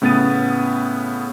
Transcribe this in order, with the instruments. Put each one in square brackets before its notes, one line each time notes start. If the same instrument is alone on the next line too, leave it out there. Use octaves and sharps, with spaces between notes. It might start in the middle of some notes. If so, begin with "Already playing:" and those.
[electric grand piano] A2 C#3 B3 D#6 A6 D#7